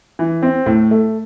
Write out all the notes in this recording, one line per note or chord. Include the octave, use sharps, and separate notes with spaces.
E3
C4
A2
A3